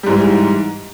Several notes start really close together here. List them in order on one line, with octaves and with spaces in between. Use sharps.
G3 G#2 E3